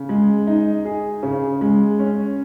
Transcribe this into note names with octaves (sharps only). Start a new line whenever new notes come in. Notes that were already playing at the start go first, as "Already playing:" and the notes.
Already playing: C#3
G#3
D#4
G#4
C#3
G#3
C#4